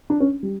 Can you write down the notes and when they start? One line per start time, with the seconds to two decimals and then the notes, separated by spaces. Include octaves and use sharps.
0.10 D4
0.20 C#4
0.43 G3